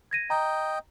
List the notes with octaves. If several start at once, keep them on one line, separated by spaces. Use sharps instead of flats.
G#6 A#6 D#7
D#5 G5 A#5